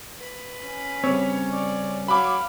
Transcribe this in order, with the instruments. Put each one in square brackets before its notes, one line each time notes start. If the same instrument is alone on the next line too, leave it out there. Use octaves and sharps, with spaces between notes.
[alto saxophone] B4
[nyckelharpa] C#4
[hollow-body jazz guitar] C#3 G3 C4 [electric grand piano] C#5
[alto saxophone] D5
[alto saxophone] F#3 [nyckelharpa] F5 [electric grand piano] B5 D6